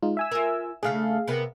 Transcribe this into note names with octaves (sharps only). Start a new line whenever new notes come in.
G#3 D#4 F4
E5 G#5 E6
F4 A#4
C#3 A3 D4 G#4 F5
C3 B3 A#4